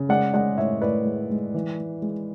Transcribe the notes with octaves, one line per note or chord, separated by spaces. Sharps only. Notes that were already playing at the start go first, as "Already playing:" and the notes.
Already playing: C#3
G#3 D5 F#5
G#3 D5 F#5
A2 C#5 E5
A2 B4 D5
G#3
G#3
E3
G#3
G#3